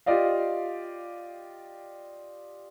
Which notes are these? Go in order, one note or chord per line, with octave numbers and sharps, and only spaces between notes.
F4 G4 D5 D#5 F5